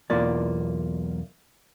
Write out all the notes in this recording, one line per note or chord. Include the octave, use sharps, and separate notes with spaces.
B1 E2 A#3 F4 D5